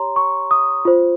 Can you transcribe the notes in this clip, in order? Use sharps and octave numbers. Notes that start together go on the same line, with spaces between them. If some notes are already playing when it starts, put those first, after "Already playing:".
Already playing: G4 C#5 A#5 C6
C#6
D#6
F4 C5